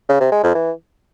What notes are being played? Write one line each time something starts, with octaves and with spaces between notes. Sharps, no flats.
C#3
C3
G#3
F2
E3